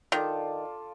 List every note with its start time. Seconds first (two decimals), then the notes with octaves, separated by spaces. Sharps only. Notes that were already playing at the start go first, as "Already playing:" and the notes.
0.12 D#3 F4 A4 D5